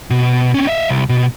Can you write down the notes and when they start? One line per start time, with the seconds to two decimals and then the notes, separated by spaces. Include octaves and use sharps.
0.10 B2
0.54 C4 C#4
0.67 D#5 E5
0.89 C2
1.09 B2